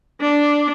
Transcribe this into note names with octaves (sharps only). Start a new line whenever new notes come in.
D4